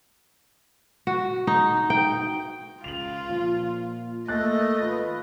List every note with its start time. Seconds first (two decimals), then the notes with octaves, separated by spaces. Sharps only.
1.07 F#4
1.47 D#4
1.90 G5
2.84 C#2 F4 F7 F#7
3.29 A#2 F3
4.28 A3 A#3 D#5 F#6 A6
4.81 G#1 F4 B4